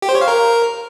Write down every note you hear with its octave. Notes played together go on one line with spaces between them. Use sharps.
G4
C5
C#5
F5
A#4